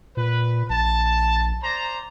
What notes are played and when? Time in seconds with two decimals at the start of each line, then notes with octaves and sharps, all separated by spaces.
0.17 A#2 B4
0.70 A#1 A5
1.62 C5 D5 A#5